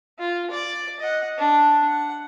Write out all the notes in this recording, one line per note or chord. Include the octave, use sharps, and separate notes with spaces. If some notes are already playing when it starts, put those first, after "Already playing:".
F4
D5
D#5 F#5
D4
F#5